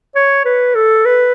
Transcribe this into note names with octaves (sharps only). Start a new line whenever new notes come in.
C#5
B4
A4
B4